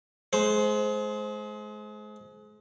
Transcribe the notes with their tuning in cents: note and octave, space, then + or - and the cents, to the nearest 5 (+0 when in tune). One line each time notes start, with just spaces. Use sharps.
G#3 +35 C5 +0